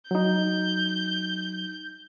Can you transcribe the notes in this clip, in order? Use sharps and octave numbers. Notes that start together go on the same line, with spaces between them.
F#3 D#4 G6